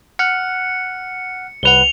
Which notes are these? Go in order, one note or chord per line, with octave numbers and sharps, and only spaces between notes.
F#5 F6 F#6 C#7
C2 B4 F#5 F7 G7